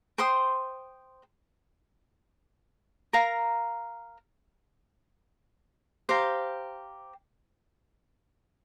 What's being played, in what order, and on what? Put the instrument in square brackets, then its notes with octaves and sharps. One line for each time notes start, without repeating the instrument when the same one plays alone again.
[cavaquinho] C5 G5 C6 D#6
A#4 F5 A#5
G4 C5 F5 A#5